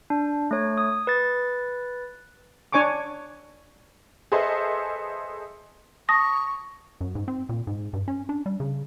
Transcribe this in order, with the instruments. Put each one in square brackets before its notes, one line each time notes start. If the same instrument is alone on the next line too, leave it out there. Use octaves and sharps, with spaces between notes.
[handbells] D4
A3 C#5
D#6
B4 A6
[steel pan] D4 C#5 G#5 C#6 D6
[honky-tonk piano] G#4 A4 B4 C5 D#5 E5
[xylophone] A5 D#6 A#6 [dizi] C#6
[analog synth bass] F#2
G#2
C4
A#2
G#2
G2
C#4
D4
G3
C#3